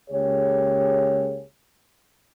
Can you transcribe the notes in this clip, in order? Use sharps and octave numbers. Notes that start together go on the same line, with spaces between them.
C#2 A#3 G4 G#4 C#5